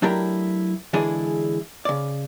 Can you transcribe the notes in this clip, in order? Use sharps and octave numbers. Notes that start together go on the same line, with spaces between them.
F#3 A3 D4 E4 G4 A#4
D3 E3 G#3 D4 E4 G#4
C#3 D5